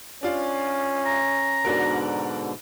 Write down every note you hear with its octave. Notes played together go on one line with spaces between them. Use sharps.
C#4 D4 F4
A#5
G#2 B2 D3 D4 F#4 A#4